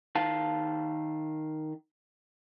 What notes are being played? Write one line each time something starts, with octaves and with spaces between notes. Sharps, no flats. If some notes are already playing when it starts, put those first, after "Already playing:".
D#3 F5 A5